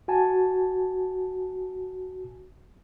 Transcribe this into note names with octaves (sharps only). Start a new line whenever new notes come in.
F#4 G#5 A5